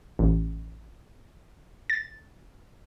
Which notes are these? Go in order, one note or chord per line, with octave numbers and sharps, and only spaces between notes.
A1
A6